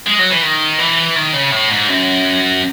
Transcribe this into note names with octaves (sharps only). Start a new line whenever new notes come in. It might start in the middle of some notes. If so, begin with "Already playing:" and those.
G#3
F#3
E3
D#3
E3
D#3
C#3
A2
G#2
F#2